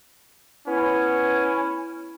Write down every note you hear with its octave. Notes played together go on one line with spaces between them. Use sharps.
B3 C#4 E4